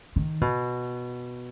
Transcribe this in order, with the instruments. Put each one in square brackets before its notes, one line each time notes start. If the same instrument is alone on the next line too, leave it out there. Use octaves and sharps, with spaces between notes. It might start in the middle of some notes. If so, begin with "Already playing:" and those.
[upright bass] D#3
B2